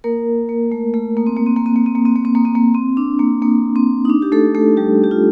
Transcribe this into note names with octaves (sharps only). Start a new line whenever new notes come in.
A#3 A#4
A#3
A3
A3
A#3
C4
A#3
C4
A#3
C4
A#3
C4
A#3
C4
A#3
C4
A#3
C4
A#3
C4
D4
A#3
A#3
C4
D#4
D4
G4
A3 A4
A3 A4
G3 G4
G4
F4